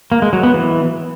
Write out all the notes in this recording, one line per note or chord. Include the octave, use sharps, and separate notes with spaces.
A#3
G#3
F#3
B3
E3